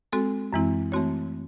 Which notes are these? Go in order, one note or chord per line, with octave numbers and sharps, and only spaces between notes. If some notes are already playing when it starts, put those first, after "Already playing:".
G#3 C4 F#4 A4
F#2 E3 G#3 C4 E4
E3 A3 C4 F#4 C#5